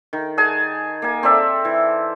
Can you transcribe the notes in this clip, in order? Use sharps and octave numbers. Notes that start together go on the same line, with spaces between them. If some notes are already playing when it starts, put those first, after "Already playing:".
D#3
G#4 F#5 G#5 A5
A#3 G#5
C4 A4 D5 E5
E3